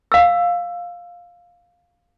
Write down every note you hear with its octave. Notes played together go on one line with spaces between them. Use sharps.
F5 E6